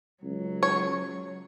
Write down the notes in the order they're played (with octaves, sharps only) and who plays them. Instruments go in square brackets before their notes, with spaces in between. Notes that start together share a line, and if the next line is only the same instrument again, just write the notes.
[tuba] C#2 [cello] F#3
[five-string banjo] C#5